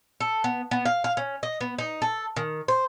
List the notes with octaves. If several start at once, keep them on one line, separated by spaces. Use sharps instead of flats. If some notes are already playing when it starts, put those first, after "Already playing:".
A4
B3
B3
F5
F5
C#4
D#5
B3
D#4
A4
D#3
C5